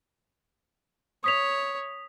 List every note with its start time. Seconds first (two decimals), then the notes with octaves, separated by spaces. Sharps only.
1.24 C#5 D#6 B6 F7